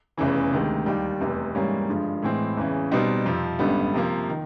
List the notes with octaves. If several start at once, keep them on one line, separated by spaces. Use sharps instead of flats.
F1 E2 C#3 E3
D2 C3 D#3 G#3
D#2 D#3 G3
F1 E2 C3
G#2 E3 G3 A#3 C#4
G2 D3 F3 G#3
A2 E3 G#3 C4
E2 C#3 E3
B2 G3 C4 D#4
F2 C3 F3
G#1 F#2 D3 G3 B3
C3 F3 A#3
D#3